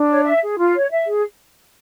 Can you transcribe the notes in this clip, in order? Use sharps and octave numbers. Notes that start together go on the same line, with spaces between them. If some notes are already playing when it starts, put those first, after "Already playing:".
Already playing: D4
C#5
E5
G#4
F4
C#5
E5
G#4